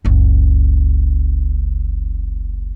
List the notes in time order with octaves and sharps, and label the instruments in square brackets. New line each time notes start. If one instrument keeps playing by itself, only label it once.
[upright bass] F#1 C#2